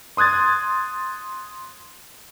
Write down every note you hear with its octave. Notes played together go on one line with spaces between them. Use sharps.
C6 D#6 F#6 G#6 A6